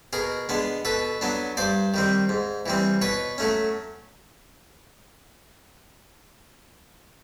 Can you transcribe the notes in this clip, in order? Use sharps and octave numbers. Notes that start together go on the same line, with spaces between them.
B2 G#4 A#4
G#3 B3 D4
B2 A4 B4
F#3 B3 D4
G2 C5 D5
D#3 G3 C4
G#2
E3 G3 C4
B2 B4 C#5
F#3 A3 C#4